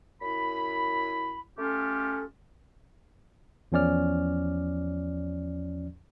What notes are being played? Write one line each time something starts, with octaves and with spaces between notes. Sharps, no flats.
F#2 E4 B5
A3 C#4 F4 G4 A4
E2 F3 C#4 D5 F6